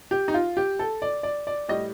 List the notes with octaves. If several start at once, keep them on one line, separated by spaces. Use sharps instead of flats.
G4
D#4
F4
G4
A4
D5
D5
D5
A2 G3 D#5